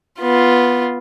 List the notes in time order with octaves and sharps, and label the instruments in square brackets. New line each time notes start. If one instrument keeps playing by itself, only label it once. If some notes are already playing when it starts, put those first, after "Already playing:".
[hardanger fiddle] B3 F4